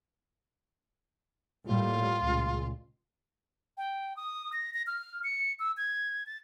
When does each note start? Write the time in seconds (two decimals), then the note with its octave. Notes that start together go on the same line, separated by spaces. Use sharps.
1.66 A2 G3 A#3 F4
2.20 C#2 A#2
3.77 G5
4.17 D#6
4.53 A#6
4.74 A#6
4.87 F6
5.24 C#7
5.59 E6
5.77 G#6
6.26 A6